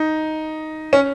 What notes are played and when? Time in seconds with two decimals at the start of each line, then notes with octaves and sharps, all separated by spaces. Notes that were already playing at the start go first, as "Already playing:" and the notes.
Already playing: D#4
0.93 C#4